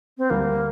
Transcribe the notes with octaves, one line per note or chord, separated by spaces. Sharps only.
C4
D2 D3 G3 A#3